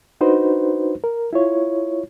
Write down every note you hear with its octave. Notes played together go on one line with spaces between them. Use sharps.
D4 D#4 F#4 B4 C5
A#4
E4 F4 C#5